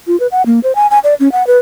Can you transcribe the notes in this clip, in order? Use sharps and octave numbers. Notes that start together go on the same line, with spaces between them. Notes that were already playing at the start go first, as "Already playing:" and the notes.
F4
B4
F#5
A#3
C5
G#5
G#5
D5
C#4
F#5
B4